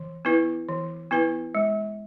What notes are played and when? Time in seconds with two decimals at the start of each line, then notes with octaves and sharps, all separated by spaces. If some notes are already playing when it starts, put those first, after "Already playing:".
Already playing: E3
0.25 B3 E4 B4
0.69 E3
1.11 B3 E4 B4
1.55 G#3